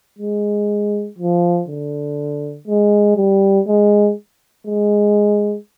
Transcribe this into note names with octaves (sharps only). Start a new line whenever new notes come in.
G#3
F3
D3
G#3
G3
G#3
G#3